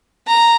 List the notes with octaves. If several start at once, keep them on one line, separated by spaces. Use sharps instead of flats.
A#5